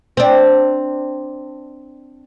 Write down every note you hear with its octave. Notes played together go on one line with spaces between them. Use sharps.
C4 D4